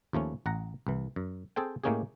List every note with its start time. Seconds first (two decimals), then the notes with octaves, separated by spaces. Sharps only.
0.13 D#2 F3 A3 C#4
0.46 A1 F#5 A#5
0.87 C2 E3
1.16 F#2
1.56 C4 G#4 A4 C5 G5
1.84 A2 G#3 A#3 C#4 G4 G#4